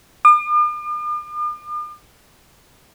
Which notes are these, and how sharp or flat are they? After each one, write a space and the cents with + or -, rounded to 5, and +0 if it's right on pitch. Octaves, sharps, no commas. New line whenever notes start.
D6 +45